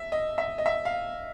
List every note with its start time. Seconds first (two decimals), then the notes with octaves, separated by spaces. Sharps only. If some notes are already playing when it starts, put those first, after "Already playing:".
Already playing: E5
0.12 D#5
0.38 E5
0.58 D#5
0.66 E5
0.85 F5